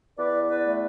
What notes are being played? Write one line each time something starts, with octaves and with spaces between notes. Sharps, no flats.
E2 B4 D5
B4 D5
A3